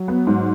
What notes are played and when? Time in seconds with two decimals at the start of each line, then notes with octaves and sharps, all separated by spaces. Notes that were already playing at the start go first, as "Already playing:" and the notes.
Already playing: F#3
0.08 B3
0.27 G#2